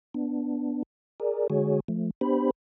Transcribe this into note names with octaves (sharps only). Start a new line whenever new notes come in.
B3 D4
G#4 A#4 D5
D3 G#3 F#4 G#4 C#5
F3 A3
B3 D4 G4 C5 B5